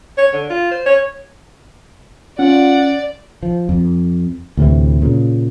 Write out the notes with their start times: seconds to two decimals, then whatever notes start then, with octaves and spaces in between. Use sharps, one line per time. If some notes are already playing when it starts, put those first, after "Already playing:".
0.18 C#5
0.33 D3
0.50 F4
0.71 C5
0.86 C#5
2.39 C#4 F4 D5 F#5
3.43 F3
3.69 F2
4.57 D2 A2 C3 E3
5.02 A#2 C#3